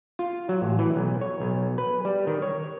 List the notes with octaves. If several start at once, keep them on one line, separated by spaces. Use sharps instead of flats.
F4
F#3
A1
E3
B1
C#5
B1
B4
G3
D#3
C#5